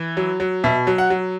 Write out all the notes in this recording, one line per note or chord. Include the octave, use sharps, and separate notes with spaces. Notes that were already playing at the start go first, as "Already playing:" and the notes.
Already playing: E3
F#3
F#3
B2 E5
F#3
F#5
F#3